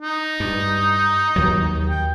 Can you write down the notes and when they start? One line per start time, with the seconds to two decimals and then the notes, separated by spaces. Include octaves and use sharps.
0.01 D#4
0.40 G2
1.36 D#2 F#3
1.90 G5